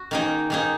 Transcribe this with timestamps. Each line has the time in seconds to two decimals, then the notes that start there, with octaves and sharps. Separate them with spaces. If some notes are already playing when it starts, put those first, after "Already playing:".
Already playing: F#4
0.11 D#3 A#3 D#4 G#4
0.50 D#3 A#3 D#4 G#4